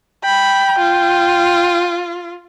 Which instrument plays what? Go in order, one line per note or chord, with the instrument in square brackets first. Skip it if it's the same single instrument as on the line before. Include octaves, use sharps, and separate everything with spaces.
[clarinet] G5 [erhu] B5
[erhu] F4